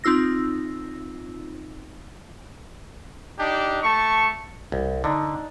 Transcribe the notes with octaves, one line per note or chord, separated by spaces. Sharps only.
C4 D#4 F4 E6 A#6
D4 D#4 G4
A3 A5 C#6
C2
D3 D4 D#4